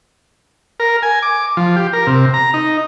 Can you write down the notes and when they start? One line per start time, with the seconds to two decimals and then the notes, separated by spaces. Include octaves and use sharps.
0.80 A#4
1.02 G#5
1.22 D6
1.57 F3
1.76 G4
1.93 A#4
2.07 C3
2.34 A#5
2.54 D#4